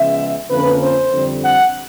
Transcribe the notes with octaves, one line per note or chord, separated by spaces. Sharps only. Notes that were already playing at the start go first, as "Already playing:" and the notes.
Already playing: C#3 F3 G#3 B3 E5
F2 D3 F3 A#3 C#4 B4
C5
F2 D3 G3 C4
F#5